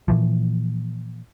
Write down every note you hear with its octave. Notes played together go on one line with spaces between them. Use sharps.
A#2 E3 F3